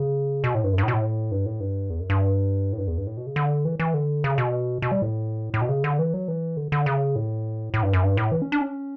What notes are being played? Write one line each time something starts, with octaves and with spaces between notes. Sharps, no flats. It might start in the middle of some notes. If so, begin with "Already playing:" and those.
Already playing: C#3
B2
A2
G2
F#2
G2
A2
B2
A2
G2
A2
G2
E2
F#2
G2
A2
G2
E2
G2
A2
B2
C#3
D3
E3
E3
D3
C#3
B2
B2
G3
A2
A2
B2
C#3
D3
E3
F#3
E3
D3
D3
C#3
A2
A2
G2
F#2
G2
A2
E3
C#4
D4
C#4